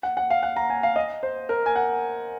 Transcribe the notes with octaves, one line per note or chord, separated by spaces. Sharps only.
F#5
F#5
F5
F#5
A#5
G#5
F5
D#5
C5
A#4
G#5
F#5